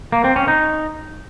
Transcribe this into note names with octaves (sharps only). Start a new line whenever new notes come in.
A#3
C4
C#4
D#4